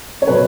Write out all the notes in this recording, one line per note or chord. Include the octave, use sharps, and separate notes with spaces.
C#5
B2 F#3 B3 B4